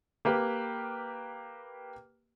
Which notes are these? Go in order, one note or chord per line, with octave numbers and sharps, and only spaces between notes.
A#3 G4 B4